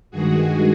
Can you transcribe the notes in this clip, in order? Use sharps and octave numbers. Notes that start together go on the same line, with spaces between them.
G2 D#3 G#3 F#4 G#4